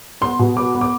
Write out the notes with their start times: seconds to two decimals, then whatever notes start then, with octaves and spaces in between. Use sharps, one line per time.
0.21 B3 C6
0.39 B2
0.56 B3 D6
0.75 B3
0.81 D6